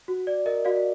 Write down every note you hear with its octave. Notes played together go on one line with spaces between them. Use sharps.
F#4
D5
A#4 D#5
F#4 D5 F5